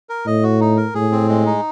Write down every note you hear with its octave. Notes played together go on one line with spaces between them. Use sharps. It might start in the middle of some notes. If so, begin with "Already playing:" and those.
A#4
A2 D#5
F#4
D#4
A#4
A2 G#4
C4
G#3
D#4